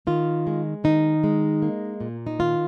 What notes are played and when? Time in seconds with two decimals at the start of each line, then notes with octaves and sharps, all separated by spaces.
0.07 D#3 F4
0.47 G#3
0.84 D#3 D#4
1.24 G#3
1.62 A#3
2.01 A#2
2.27 D#4
2.39 D#3 F4